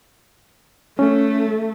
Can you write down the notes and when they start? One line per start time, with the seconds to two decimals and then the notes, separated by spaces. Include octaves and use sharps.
0.99 A3 C#4